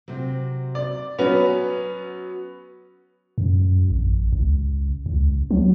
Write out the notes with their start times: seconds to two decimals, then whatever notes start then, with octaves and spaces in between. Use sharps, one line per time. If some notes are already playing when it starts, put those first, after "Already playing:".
0.08 C3 F#3
0.75 D5
1.19 F#3 B3 C#4 B4
3.38 F#2
3.90 A1
4.32 C#2
5.06 C#2
5.51 F#3